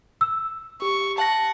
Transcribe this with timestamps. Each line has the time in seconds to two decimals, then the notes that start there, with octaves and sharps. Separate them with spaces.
0.21 E6
0.82 G4 C#6
1.18 F#5 A5 A#6